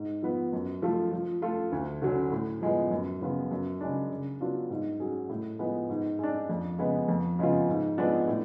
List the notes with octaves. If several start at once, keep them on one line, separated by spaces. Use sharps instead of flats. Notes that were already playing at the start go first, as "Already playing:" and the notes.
Already playing: G#2
F3 B3
F#2
F3 A3 F4 A4
F3
A3 F4 A4
D2
D3 F#3 C#4
A2
F3 G#3 B3
F#2
C#3 F3 B3 F4
F#2
C#3 G#3 D4
C#3
F#3 B3 D4 F4
G#2
F#3 C#4 G#4
A2
F3 G#3 B3
G#2
G#3 D4
F2
C#3 G#3 B3
F2
C#3 G#3 B3 F4
G#2
F3 G#3 B3 D4
A2